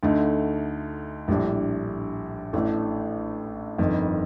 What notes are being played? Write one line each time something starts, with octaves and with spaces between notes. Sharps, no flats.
D2 D3 A3 D#4
A#1 A2 G3 D4
A1 A2 A3 D4
G1 F2 D#3